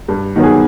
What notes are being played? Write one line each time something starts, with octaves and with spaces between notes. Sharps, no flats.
G2
D#3 F#3 B3
G#4